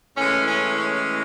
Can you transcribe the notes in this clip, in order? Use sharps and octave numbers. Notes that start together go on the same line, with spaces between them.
A2 E3 G#3 C#4
C#4
C#4